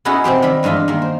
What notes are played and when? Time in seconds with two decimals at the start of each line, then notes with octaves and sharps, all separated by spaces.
0.05 B3 C#4 D#4 E4 F#4 G#4
0.24 C3 C4 G4 C5
0.42 D#3 G3 G4 E5 B5
0.63 E2 G2 G#3 F4 E5
0.88 D#3 A#3
1.02 C5